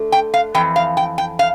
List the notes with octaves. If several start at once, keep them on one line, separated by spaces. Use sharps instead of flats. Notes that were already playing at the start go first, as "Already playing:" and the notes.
Already playing: D3 A3
G5
F5
F2 E3 G5
F5
G5
G5
F5